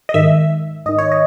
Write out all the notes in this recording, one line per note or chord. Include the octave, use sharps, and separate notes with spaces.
D#5
G#2 D#3 E5
G#2 D#3 D#5
C#5
D#5